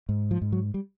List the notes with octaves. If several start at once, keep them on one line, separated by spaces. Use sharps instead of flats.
G#2
F3
G#2
F#3
G3